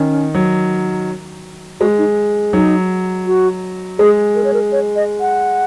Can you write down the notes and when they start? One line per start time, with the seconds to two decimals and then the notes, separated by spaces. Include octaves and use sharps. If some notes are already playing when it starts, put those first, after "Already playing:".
Already playing: D#3 C#4
0.34 F#3
1.80 G#3 F#4
1.98 D#4
2.53 F#3 D#4
3.26 F#4
3.99 G#3 G#4
4.35 A#4
4.44 C#5
4.54 A#4
4.72 C#5
4.96 D#5
5.20 F#5